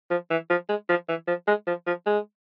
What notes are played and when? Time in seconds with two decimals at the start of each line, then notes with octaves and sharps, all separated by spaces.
0.10 F3
0.30 E3
0.50 F3
0.69 G#3
0.89 F3
1.08 E3
1.27 F3
1.47 G#3
1.67 F3
1.87 F3
2.06 G#3